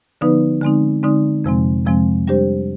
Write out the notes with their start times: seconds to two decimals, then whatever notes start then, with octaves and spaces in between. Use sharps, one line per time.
0.21 D3 F3 B3 D#4 B4
0.61 D3 G#3 C4 D#4
1.03 D3 G#3 C4 D#4
1.44 F2 C3 F3 G#3 C4
1.85 F2 C3 F3 G#3 C4
2.27 G3 D4 G4 C5